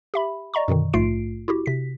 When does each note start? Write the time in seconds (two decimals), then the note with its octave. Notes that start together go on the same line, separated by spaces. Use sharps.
0.14 G4 E5 B5
0.54 D5 D#5 A#5 C#6
0.68 F#2 B2 D3 D#3
0.93 A#1 G#2 A3 F4 C7 D7
1.48 E4 F#4 G4
1.66 C3 B6